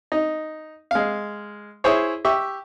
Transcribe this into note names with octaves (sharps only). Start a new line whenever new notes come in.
D#4
G#3 F5
E4 G#4 C5 C#5
G4 E5 C#6